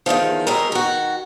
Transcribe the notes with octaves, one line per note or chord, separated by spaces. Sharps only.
E2 A#2 D#3 F3
B2 G#3 C4 A#4
D#3 F#4